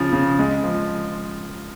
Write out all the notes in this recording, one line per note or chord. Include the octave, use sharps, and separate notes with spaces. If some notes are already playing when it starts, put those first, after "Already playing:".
Already playing: C#3 F3
C#3
G#3
F3